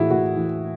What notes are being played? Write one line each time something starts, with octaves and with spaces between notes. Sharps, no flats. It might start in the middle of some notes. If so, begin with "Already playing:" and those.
Already playing: A2 E3 E4 F#4 G#4
A2 F#4
E3